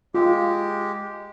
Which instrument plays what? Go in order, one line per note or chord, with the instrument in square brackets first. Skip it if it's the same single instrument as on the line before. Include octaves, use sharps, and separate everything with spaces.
[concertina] G#3 G4 [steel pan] F4